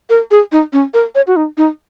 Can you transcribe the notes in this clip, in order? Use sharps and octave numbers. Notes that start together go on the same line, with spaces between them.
A#4
G#4
D#4
C#4
A#4
C#5
F#4
D#4
D#4